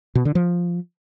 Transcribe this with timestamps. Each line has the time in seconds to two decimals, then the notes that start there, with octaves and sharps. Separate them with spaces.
0.15 B2
0.25 D3
0.35 F3